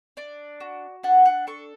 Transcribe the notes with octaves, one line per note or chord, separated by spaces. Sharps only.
D4 D5
F#4
D4 F#5
F#5
A4 C#6